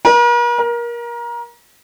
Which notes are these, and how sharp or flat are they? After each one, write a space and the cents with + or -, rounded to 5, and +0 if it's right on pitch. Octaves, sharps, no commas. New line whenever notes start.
A#4 +45
A#4 +25